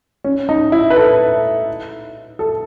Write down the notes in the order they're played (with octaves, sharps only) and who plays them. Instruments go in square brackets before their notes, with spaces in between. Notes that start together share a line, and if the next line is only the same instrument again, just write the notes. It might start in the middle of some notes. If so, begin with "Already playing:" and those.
[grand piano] C#4
D#4
E4
B4
A4
A4